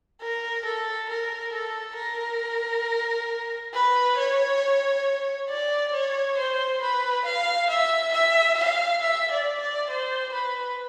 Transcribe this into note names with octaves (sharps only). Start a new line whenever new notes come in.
A#4
A4
A#4
A4
A#4
B4
C#5
D5
C#5
C5
B4
F5
E5
E5
F5
E5
D5
D5
C5
B4